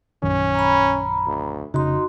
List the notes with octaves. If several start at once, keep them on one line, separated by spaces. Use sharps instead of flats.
A#1 F#2 D#3 C#4
A#5 B5
D2
F1 C#3 D#4 F#4 C6